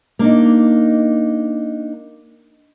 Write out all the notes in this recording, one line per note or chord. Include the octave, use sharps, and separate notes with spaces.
A#3 D4 D#4